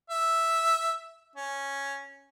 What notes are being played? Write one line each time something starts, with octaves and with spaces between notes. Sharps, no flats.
E5
C#4